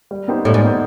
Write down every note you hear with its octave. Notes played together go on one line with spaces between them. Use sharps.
G3
B3 D#4 G4 C5
A2 G3
G#2
B3 D#4 G4 C5